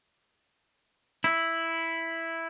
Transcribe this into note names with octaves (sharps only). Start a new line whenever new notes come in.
E4